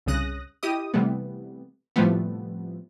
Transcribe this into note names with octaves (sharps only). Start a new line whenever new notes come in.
C2 G2 C#3 D#6 F#6 A#6
E4 G4 D#5 D#6
C3 E3 G3 A3 B3
A2 C3 F3 G3 A3 B3